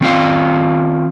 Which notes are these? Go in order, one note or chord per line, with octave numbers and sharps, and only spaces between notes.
D#3 C4 F4 F5